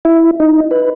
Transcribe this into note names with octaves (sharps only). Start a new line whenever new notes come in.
E4
D#4
B4